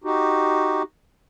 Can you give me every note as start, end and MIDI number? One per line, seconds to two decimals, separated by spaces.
0.04 0.82 63
0.04 0.82 66
0.04 0.82 67